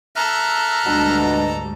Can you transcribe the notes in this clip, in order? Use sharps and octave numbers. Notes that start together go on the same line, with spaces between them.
A4 E5 A#5 F6 F#6
D2 G#2 B2 G3 D4